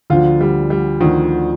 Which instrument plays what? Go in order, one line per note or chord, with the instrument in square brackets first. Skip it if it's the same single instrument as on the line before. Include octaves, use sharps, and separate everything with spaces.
[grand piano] D2 D3 F3 [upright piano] F4
[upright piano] G3
G3
[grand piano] D2 D3 F3 [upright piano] D#3